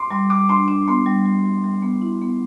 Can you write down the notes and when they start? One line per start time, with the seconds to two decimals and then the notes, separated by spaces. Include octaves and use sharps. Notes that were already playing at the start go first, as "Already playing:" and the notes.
Already playing: C6 D6
0.11 G3 C6
0.30 G3 D6
0.49 D4 C6
0.68 D4
0.88 B3 C6
1.06 G3
1.25 G3
1.45 G3
1.64 G3
1.82 B3
2.02 E4
2.22 B3